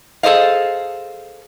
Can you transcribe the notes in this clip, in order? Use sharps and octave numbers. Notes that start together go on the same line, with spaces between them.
G#4 A4 C5 D#5 F5